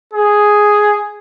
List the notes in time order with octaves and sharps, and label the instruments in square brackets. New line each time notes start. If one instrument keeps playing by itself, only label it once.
[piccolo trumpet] G#4